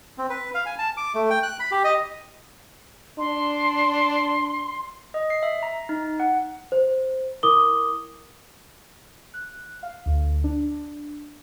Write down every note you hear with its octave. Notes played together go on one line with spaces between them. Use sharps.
C4
B4
F5
G#5
A5
D6
A3
G5
F#6
B5
G4
D#5
D4 C6
D#5
C7
E5
A#5
D#4
F#5
C5
E4 A#4 D6 D#6 G7
F#6
F5
D2
D4